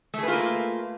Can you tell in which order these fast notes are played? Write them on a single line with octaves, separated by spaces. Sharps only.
A3 G#4 B4 F4 A#3